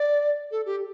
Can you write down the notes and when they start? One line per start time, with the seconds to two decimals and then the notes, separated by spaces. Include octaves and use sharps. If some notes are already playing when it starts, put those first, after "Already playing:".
Already playing: D5
0.51 A4
0.66 G4